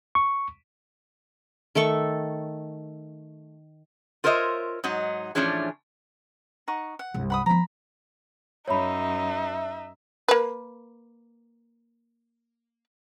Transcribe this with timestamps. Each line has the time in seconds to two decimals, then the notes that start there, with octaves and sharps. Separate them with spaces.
0.15 C#6
1.75 D#3 A3 A4 C#6
4.24 F4 A#4 C5 C#5 D#5 E5
4.84 G#2 F#3 D#4
5.35 A2 E3 F3 C#4 D4 G#4
6.68 D#4 F#5 C#6
6.99 F#5
7.14 C2 G2
7.30 F#5 B5 D#6
7.46 F3 B3 A#5 B5
8.68 F#2 D#4 C#5 E5 B5
10.29 A#3 B4